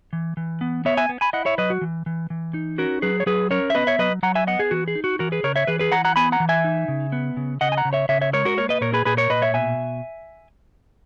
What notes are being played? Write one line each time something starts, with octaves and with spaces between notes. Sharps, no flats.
E3
E3
B3
B3 C#5 E5
E5 G#5
B3
G#5 B5
E4 D#5 F#5
C#5 E5
F#3 B4 D#5
F#4
E3
E3
E3
D#4
C#4 F#4 A#4
F#3 G#4 B4
C#5
F#3 G#4 B4
C#4 A#4 C#5
E5
B3 B4 D#5
C#5 E5
F#3 B4 D#5
F#3 F#5 A#5
E5 G#5
B3 D#5 F#5
G#4
E3 F#4
G#4
D#4
F#4
E3 F#4 A#4
G#4 B4
C#3 A#4 C#5
C#5 E5
E3 G#4 B4
G#4 B4
E3 F#5 A#5
F#5 A#5
B3 G#5 B5
F#5 A#5
E3
E5 G#5
D#4
C#3
B3
C#3
C#3 D#5 F#5
G#5
F#5 A#5
C#3
C#5 E5
C#3 C#5 E5
C#5 E5
G#3 A#4 C#5
F#4 A#4
A#3 A#4 C#5
B4 D#5
A#2 A#4 C#5
G#4 B4
A#2 G#4 B4
A#4 C#5
A#2 B4 D#5
C#5 E5
B2 E5 G#5